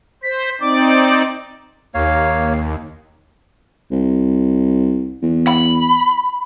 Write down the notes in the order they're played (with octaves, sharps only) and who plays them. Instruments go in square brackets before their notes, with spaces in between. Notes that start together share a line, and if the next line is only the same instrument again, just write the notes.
[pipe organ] C5 [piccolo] B6
[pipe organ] C4 D#4 D5 [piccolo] D6
[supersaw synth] D#2 [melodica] A#3 C#5 F5
[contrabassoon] C2
E2
[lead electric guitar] B5